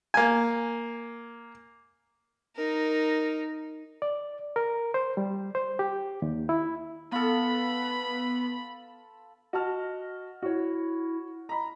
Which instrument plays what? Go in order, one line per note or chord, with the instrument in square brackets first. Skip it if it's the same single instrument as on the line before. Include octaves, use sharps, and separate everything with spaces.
[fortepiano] A#3 G#5
[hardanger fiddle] D#4 A#4
[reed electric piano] D5
A#4
C5
G3
C5
G4
D#2
E4
[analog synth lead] B3 [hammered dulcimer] F4 A4 [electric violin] B5
[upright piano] F#4 A5 F6 [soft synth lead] D#5
[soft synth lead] E4 [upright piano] F#4 C#5
[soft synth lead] D#5 [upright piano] A#5 B5